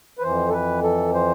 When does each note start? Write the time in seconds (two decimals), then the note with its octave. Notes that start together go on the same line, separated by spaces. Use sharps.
0.18 B4
0.22 F2 E3 C5
0.49 A4
0.53 B4
0.83 A4
1.14 C5